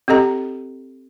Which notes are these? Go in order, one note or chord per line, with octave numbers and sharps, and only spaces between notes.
C4 G4 A4 D#5 A#5